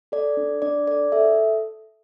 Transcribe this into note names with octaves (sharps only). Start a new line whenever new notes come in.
A4 D5
D4
D4 D5
A4 D5
A4 E5